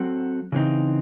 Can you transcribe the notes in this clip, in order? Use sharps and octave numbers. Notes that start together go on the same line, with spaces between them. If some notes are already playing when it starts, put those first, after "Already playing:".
Already playing: F#3 C4 F#4 A4
C#3 E3 C4 D#4